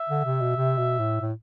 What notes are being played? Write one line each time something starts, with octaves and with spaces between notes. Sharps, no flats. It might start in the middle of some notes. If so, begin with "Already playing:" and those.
Already playing: E5
D3
C3
B2
C3
B2
A2
A2